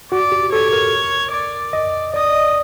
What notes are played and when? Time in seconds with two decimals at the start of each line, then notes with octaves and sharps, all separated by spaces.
0.12 F#4 D5
0.32 G4
0.52 A4 C#5
0.73 A#4
1.32 D5
1.73 D#5
2.13 D5 D#5